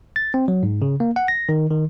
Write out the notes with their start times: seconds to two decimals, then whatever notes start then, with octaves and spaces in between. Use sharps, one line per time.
0.16 A6
0.34 C4
0.48 F#3
0.63 G#2
0.82 C#3
1.00 A#3
1.16 F#5
1.28 A#6
1.49 D#3
1.71 D#3